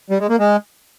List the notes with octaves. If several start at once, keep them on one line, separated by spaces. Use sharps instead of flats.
G3
G#3
A#3
G#3